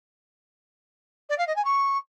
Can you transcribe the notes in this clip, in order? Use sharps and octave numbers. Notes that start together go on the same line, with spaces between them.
D5
F5
D#5
G#5
C#6